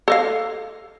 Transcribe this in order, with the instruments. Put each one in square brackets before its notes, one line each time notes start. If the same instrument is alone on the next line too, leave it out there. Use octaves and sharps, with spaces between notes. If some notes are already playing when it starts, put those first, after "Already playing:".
[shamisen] A4 D#5 F5